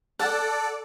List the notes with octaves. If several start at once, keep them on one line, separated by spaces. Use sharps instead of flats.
A4 D5 F#5 A5